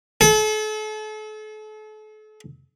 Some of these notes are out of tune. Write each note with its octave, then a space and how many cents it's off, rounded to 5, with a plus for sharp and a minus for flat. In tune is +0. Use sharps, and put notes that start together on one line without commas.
A4 -40